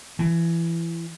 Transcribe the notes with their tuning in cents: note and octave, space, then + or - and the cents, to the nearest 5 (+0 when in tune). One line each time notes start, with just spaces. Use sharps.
E3 +25